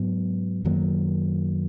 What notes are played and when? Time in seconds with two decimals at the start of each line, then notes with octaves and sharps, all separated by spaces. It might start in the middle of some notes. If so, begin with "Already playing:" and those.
Already playing: G#2 F#3 B3
0.65 F#2 D#3 F#3 A#3